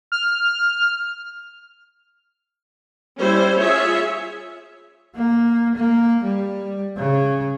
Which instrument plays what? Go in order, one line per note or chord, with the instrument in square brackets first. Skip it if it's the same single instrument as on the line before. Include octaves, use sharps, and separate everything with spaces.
[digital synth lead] F6
[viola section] G3 C#4 E4 C5
F4 G#4 C#5 E5
[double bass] A#3
A#3
G3
C#3